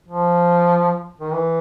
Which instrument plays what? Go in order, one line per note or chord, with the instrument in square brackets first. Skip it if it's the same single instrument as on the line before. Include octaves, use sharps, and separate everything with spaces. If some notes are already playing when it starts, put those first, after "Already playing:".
[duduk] F3
D#3
E3